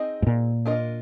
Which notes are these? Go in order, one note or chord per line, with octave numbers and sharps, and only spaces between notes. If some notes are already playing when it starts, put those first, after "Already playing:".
Already playing: C4 D#4 G#4 D#5
G#2
A#2
D4 F4 A#4 D#5